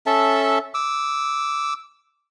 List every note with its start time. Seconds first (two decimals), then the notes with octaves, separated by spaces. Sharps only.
0.06 C#4 A4 E5 A5
0.74 D6 E6